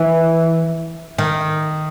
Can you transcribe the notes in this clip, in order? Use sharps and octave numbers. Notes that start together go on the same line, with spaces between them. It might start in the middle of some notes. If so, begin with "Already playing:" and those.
Already playing: E3
D#3